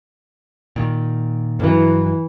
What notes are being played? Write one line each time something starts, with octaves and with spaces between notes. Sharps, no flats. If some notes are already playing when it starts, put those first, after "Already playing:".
A#2 D#3
G2 E3 F#3